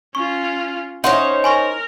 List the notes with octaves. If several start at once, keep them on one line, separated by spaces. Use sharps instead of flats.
C#4 F4 C#6
C#4 D#4 C5 C#5 E5 F#5 C6
A#4 G#5 C6 C#6